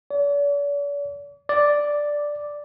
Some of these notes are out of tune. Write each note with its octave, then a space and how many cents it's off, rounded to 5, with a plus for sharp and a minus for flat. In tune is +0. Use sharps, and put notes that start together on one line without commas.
D5 -45
D5 +0